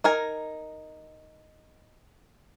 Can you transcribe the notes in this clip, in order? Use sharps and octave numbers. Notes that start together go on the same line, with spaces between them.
D#4 A#4 G#5